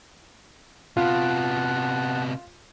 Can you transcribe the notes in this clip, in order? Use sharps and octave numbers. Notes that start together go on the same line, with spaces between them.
C3 B3 F4 F#5 A5